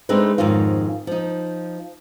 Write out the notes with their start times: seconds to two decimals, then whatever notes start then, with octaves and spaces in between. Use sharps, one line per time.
0.09 G#3 A3 C4 D4 D#4 B4
0.38 F2 G#2 D#3 C#4 F4
1.07 F3 D#4